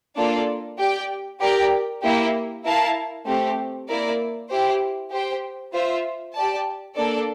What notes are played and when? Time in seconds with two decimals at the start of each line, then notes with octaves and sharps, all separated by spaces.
0.17 A#3 D4 F4 A4 D5
0.79 G4 D5 G5
1.40 G4 A#4 D5 G5
2.02 A#3 E4 G4
2.64 E4 A#4 F5 A5
3.26 A3 C4 G4
3.88 A#3 E4 A#4 D5
4.49 E4 G4 C5
5.11 G4 C5 G5
5.73 F4 C5 E5
6.34 G4 D5 A5
6.96 A#3 D4 A4 D5